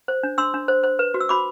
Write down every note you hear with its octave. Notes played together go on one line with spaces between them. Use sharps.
C5
D4
D4 C6 E6
D4
C5
C5
B4
F#4
E6
F#4 B5 D6